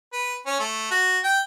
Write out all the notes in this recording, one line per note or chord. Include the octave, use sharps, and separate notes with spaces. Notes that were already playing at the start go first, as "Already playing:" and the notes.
B4
C#4
A3
F#4
G5